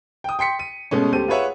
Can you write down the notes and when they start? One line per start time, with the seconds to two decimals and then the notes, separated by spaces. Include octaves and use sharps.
0.24 G5 D#6
0.39 G5 C6 B6 C#7
0.59 D#7
0.91 B2 G#3 A3 C#4
1.12 D2 G4 A4 C5 D#7
1.28 F4 G#4 B4 C#5 E5 F#5